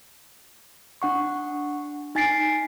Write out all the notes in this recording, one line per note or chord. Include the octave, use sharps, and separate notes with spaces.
D4 F#5 C#6
D#4 G#5 A6 B6 C7 D7